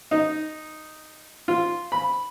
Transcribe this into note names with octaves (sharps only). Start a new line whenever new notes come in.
D#4
F4
B5